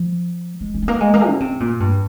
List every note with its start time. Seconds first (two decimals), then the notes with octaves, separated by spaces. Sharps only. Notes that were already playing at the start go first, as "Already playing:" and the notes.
Already playing: F3
0.61 G#3
0.75 C#4
0.82 G#3
0.88 A#3
1.01 G#3
1.14 A#3
1.27 C#3
1.40 C3
1.60 A#2
1.80 G2